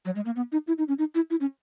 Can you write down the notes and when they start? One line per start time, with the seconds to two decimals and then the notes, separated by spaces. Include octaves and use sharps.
0.05 F#3
0.16 G#3
0.26 A#3
0.36 B3
0.52 D#4
0.68 E4
0.78 D#4
0.88 C#4
0.99 D#4
1.15 E4
1.30 E4
1.40 C#4